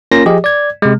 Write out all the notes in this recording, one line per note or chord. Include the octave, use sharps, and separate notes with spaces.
A#3 C#4 F4 A#4 A#6
F3 G4 G#4 D#5
D5 G#6
C3 G#3